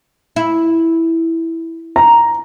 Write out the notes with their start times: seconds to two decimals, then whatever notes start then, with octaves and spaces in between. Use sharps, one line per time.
0.36 E4
1.96 A#5